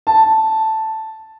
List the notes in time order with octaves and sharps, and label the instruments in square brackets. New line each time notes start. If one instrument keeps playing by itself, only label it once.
[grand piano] A5